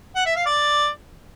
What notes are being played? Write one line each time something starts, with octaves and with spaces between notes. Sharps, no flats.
F#5
E5
F5
D5